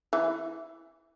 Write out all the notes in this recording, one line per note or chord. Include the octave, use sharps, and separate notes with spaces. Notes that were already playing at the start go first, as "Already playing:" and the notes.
E3